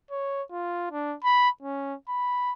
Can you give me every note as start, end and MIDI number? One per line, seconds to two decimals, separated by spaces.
0.11 0.43 73
0.51 0.90 65
0.91 1.16 62
1.24 1.49 83
1.63 1.94 61
2.09 2.53 83